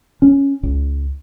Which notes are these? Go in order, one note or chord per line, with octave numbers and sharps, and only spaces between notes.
C#4
C#2